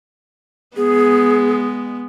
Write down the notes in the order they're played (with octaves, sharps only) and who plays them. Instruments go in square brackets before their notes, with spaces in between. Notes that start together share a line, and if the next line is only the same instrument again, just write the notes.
[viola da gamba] G#3 B3 [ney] G#4